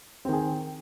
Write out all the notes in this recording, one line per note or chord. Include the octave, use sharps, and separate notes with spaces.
D#3 C4 G#4